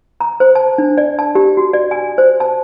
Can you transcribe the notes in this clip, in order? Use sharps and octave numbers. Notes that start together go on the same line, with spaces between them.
A#5
C5
A5
D4
D5
A5
G4
F#4
D5
G#5
C5
A5